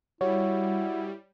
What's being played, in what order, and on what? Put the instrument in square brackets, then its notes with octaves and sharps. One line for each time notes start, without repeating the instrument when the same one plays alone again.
[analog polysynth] G3 [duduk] E4 [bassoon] F#4 [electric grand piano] C#5